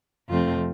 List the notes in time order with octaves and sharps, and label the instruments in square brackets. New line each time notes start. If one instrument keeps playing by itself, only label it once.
[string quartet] F2 C3 A3 C4 F4